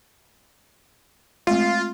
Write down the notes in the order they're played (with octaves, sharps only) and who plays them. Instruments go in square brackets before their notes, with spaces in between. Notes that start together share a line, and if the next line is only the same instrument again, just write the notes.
[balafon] G#3 A3 C4 [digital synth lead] F4